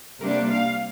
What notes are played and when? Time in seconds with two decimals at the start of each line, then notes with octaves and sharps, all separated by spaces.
0.20 C3 G3 A#3 D4 A#4
0.50 F5